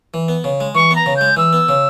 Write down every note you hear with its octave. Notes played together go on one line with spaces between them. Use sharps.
E3
B3
C#3
G#3
E3 C#6
B3 A#5
C#3
G#3 G6
E3 E6
B3
C#3